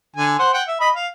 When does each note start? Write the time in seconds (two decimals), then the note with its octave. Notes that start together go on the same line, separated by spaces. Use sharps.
0.16 D3 G#5
0.39 C5 F#5 C6
0.54 F#5 G5
0.68 E5
0.80 D#5 B5
0.95 F5